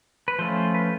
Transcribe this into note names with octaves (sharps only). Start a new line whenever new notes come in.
B4
F3 A3 C#4 F4 C5
B4